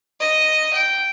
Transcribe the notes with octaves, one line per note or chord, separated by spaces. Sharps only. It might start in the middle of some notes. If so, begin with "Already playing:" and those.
D#5
G5